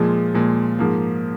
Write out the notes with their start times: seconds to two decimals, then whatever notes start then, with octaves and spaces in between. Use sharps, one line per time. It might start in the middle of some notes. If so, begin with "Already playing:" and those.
Already playing: A#2 F3 G#3
0.34 A#2 F3 G#3
0.79 G#2 F3 A#3